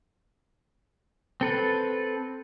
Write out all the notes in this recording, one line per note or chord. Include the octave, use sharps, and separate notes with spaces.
C4 A4 B4